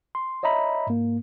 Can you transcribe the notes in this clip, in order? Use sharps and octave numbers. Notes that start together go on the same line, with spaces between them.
C6
C#5 D#5 E5 A#5 B5
G#2 A#3